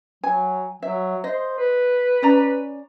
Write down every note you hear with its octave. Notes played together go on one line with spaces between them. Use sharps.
F#3 G#5
F#3 E5
C5 D#5
B4
C#4 D5 A#5